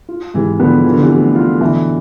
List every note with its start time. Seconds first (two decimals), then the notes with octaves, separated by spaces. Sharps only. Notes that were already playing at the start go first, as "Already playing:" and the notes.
0.09 F4
0.34 G#2 C3 E3
0.60 D3 F3 B3
0.84 E3 F4
0.94 D3
1.02 C3 E3
1.10 A3
1.35 F4
1.61 B2 D3 E3